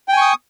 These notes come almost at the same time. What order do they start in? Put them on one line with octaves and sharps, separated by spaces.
G5 G#5 C#6 D#6